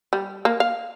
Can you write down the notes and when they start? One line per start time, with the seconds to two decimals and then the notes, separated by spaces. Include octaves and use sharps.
0.13 G3
0.45 A#3
0.60 F5